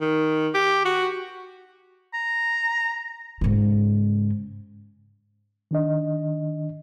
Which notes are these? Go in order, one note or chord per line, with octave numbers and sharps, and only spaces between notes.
D#3
G4
F#4
A#5
G#2 C#3
D#3 D4 D#5